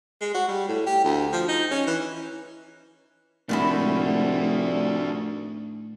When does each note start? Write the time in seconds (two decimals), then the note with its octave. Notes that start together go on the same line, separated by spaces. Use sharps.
0.21 G#3
0.35 F#4
0.48 G3
0.69 A2
0.86 G4
1.04 D2
1.33 F3
1.48 D#4
1.71 C#4
1.87 E3
3.49 F1 A2 D#3 G#3 D4 E4 F#4